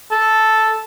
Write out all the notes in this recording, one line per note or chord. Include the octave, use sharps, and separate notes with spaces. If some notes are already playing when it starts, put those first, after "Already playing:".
A4